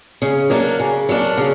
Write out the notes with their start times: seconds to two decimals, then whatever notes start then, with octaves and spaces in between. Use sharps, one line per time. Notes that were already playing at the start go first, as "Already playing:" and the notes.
0.22 C#3
0.50 F#3 A#3 D4
0.80 C#3
1.09 F#3 A#3 D4
1.37 C#3